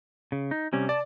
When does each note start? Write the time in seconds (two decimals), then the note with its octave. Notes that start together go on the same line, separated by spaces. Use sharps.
0.32 C#3
0.51 D#4
0.73 C3 G3 C#4
0.89 D5 A5